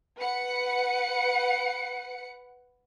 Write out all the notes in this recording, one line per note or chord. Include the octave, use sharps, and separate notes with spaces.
B4 F#5 C#7